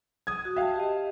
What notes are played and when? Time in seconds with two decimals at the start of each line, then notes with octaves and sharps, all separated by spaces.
0.27 D#6 G#6
0.45 F#4
0.56 E5 F5 G5 A5
0.76 G4 D#5